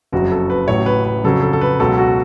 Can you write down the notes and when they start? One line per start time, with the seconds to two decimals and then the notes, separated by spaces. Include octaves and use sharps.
0.12 F#1 F2 C#3 F#3 F#4
0.31 A4
0.50 B4
0.68 A1 A2 F#3 C#5
0.86 B4
1.05 B4
1.24 F2 C#3 F#3 A4
1.42 A4
1.53 A4
1.61 B4
1.80 C#2 B2 F#3 A4
1.98 F#4